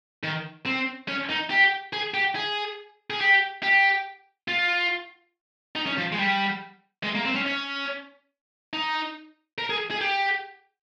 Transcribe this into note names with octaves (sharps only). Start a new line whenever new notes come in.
D#3
C4
C#4
D#4
G4
G#4
G4
G#4
G#4
G4
G4
F4
D#4
C#4
F3
G#3
G3
G#3
A#3
C4
C#4
C#4
D#4
A#4
G#4
G#4
G4